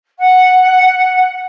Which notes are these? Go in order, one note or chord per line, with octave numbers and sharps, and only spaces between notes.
F#5